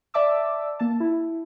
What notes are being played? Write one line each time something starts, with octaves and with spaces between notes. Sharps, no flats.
D5 E5 A5 D6 E6
A#3 A5
E4